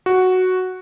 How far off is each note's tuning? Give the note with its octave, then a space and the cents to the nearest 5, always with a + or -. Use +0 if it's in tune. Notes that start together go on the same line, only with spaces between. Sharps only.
F#4 +0